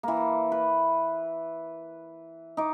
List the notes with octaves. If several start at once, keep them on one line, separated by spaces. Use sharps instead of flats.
E3 A#3
B4
D#4 D6